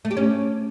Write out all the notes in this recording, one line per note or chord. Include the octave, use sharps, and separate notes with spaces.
A3
G4
C#4